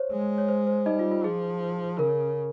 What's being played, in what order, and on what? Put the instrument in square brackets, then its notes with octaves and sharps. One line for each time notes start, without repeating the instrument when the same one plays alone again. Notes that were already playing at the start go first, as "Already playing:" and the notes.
Already playing: [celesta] C5 C#5
[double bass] G#3
[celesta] C#5
C5
C5
[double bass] G3 [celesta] D#4 D#5
[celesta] F4
F4
[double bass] F3 [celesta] G#4
[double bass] C#3 [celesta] A#4